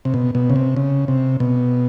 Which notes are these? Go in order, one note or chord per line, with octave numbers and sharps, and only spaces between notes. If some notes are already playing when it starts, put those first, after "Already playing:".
C3
B2
B2
C#3
C3
C#3
C3
B2